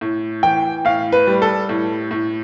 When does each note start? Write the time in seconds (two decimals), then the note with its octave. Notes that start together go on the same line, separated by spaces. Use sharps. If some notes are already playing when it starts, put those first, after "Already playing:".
0.01 A2
0.43 E3 G5
0.85 A2 F5
1.12 B4
1.27 G3
1.42 A4
1.69 A2
2.11 A2